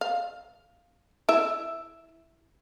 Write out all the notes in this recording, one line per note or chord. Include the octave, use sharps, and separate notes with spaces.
F5
E4 E5